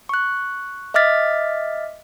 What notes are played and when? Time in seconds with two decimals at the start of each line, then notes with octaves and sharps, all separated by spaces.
0.09 C#6 F#6
0.94 D#5 E5 D6 F6 A6 B6